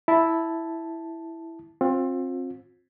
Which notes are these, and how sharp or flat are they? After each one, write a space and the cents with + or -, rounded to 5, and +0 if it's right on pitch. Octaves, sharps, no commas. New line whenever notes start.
E4 +0 A5 +0
C4 +25 F4 +35